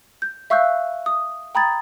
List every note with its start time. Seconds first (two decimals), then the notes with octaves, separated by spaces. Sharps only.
0.22 G6
0.50 E5 F5 C#6 E6 F#6 G6
1.06 D#6
1.55 G5 A#5 B5 D#6 G#6 A6